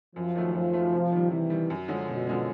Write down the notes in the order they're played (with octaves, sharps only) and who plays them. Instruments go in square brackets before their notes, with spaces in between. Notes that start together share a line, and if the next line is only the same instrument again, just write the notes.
[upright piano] F#2 [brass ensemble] F3
[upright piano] D#3 F#3 A3
[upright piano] F#2 [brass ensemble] F3
[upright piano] D#3 F#3 A3
C3
D#3 G3
[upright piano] C3 [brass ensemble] E3
[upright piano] D#3 G3
F#2
D3 F3 G#3 C#4
[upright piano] F#2 [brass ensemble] B2
[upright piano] D3 F3 G#3 C#4